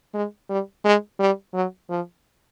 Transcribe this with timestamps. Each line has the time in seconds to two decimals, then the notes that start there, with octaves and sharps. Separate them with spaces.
0.14 G#3
0.49 G3
0.85 G#3
1.20 G3
1.54 F#3
1.90 F3